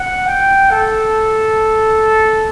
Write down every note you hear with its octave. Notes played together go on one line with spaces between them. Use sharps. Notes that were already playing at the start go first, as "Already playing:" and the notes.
Already playing: F#5
G5
A4